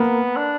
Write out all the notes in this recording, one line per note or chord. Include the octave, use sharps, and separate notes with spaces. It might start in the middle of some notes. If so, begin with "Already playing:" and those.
Already playing: A#3 B3
D4